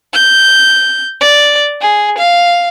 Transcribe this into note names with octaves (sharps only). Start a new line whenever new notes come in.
G6
D5
G#4
F5